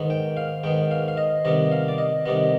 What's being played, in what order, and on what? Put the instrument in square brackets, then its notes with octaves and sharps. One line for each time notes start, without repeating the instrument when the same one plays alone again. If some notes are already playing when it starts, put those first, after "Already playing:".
Already playing: [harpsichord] G#2 D#3 B3
G5
F5
G#2 D#3 B3 G5
F5
F5
D#5
C3 D#3 G3 B3 D#5
F5
D5
D#5
C3 D#3 G3 B3 D#5